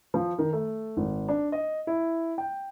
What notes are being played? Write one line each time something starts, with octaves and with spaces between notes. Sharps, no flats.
F3
D#3
A3
G#1
D4
D#5
E4
G5